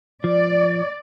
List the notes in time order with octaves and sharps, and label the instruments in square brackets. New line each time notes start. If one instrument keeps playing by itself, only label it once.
[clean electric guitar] F3 [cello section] D5